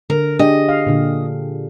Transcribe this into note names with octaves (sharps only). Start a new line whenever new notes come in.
D3 A#4
D4 G4 G#4 D#5
F5
A#2 D3